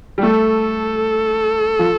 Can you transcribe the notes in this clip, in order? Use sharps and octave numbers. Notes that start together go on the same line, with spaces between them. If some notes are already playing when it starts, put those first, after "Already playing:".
G3
A3 A4
F3